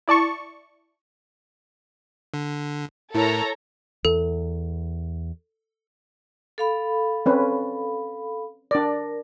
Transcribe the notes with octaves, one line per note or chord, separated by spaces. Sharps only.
E4 D5 A5 C#6
D3
A2 E4 A4 A#4 C#5 A#5
E2 A4
A4 F5 B5
C4 C#4 B4
D4 A#4 D5